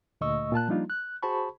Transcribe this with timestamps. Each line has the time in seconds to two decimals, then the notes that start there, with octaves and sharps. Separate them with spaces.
0.21 D2 A#2 A3 D#5 C#6 E6
0.52 A#2 F4 A5 F#6
0.68 F3 G3 A#3 D4 D#4 F4
0.90 F#6
1.23 F#4 G#4 C5 A5 B5 C#6